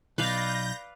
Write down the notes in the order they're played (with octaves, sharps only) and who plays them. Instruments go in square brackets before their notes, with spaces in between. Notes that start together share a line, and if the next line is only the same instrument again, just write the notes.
[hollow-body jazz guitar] B1 [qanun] B4 D5 F5 [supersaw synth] G6 A#6